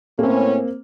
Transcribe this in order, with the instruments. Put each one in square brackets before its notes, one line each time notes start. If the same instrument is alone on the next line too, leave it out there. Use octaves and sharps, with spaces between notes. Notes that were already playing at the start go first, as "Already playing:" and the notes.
[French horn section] A2 C#4 [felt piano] A#3 C4